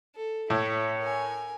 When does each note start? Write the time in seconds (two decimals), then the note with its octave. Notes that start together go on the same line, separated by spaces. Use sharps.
0.16 A4
0.50 A2 E4 C#5 E5
0.98 A#4 G#5